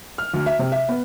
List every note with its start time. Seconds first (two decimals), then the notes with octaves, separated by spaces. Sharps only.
0.18 F6
0.34 D2
0.46 E5
0.59 C3
0.72 E5
0.89 B3